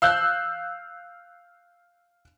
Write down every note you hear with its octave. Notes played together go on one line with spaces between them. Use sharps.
F5 E6 F#6 G6